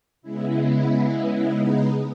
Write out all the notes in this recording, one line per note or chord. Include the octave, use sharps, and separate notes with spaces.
C#3 G#3 B3 E4
E4
E4
D#4